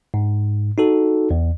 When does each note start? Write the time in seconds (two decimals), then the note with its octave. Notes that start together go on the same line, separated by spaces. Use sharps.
0.14 G#2
0.78 D#4 F#4 A4
1.31 E2